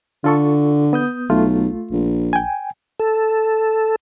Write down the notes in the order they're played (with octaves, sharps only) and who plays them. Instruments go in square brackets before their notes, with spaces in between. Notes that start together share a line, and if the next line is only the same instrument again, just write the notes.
[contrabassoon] D3 [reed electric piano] F4 A4 C#6
[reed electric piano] B3 D#6 G6
[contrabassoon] B1 [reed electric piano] A3 F4
[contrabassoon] A#1
[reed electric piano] G5 G#5
[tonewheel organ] A4